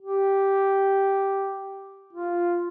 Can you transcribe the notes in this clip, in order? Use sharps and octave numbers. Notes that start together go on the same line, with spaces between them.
G4
F4